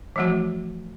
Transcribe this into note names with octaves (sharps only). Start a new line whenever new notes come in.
E3 F3 G3 A3 F#4